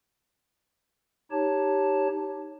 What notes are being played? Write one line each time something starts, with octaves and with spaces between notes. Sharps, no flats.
D#4 G4 C#5 A5